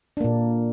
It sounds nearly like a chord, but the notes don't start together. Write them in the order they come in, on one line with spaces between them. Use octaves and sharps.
D4 A#3 A#2